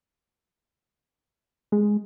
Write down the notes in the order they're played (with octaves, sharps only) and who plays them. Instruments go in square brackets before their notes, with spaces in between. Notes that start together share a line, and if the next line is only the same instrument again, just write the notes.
[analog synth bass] G#3